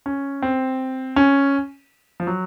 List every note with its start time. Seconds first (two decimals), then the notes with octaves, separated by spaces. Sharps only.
0.06 C#4
0.42 C4
1.16 C#4
2.20 F3
2.27 F#3